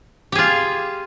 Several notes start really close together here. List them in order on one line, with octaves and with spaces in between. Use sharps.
G4 G#4 F4